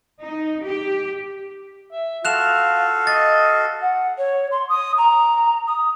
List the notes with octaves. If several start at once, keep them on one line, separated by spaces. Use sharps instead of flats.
D#4
G4
E5
F4 F#4 A4 F5 F#6 E7 F7
D#5 A6
F#5
C#5
C6
D#6
A#5
D#6